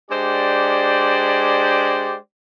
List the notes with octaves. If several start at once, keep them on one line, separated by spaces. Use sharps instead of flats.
G#3 D4 G4 C5 D5